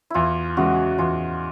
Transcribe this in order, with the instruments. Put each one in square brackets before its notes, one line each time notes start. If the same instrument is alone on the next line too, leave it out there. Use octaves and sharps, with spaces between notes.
[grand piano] E2 [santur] E4 F4
[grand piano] C#3 E3 G#3 [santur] F#4
[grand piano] E2 [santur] F4